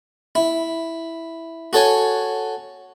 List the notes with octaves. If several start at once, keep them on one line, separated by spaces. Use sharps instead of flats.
E4
F#4 A4 C#5 G#5